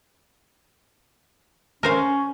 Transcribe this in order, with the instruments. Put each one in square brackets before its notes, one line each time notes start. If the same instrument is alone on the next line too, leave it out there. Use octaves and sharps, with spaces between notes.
[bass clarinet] C#4 [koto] A#4 C5 F5